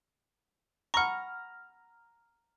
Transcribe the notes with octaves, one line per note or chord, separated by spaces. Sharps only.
F#5 A#5 B5 C#6 F6